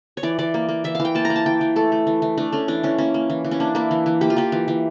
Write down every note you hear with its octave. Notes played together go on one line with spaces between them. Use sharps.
C#5
E3 D5
E3 D5
A#3
A#3
E3 E5
E3 F5
G5
A#3 A5
A#5
A#3
A5
E3 G5
E3
A3 A4
A3
E3
E3
A3 D4
A3 C#4
E3 D4
E3 C#4
A#3 C#4
A#3
E3
E3
C#4
A#3 D4
A#3 E4
E3
E3
A#3 G4
F4
A#3 G4
E3
E3